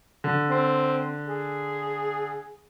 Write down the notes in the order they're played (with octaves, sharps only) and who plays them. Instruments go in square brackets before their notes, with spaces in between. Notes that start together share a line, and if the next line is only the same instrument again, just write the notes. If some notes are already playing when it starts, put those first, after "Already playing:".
[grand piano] D3
[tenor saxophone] C4
G#4